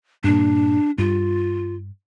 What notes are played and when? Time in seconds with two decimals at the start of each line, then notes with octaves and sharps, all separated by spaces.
0.24 G2 A#2 D4
0.98 G2 F4